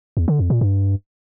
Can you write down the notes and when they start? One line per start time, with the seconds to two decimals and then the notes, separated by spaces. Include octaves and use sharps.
0.17 E2
0.28 D3
0.39 F2
0.50 A#2
0.61 G2